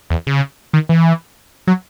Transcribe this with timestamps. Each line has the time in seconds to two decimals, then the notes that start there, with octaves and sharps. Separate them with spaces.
0.10 E2
0.27 C#3
0.73 D#3
0.89 E3
1.67 F#3